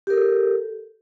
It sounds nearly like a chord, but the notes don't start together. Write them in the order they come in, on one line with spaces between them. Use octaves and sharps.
G4 A#4 A4